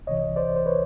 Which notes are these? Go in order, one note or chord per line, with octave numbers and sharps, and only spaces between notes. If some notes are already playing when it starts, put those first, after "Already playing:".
C2 C3 E3 C#5 D#5
C5 D5
C5
B4 C#5